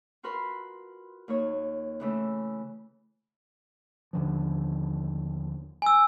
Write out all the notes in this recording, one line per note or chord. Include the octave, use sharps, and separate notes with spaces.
F4 F#4 A#4 B4 B5 C6
D#2 A#3 C#5
C#3 E3 A3
D#2 D3 F3
G#5 E6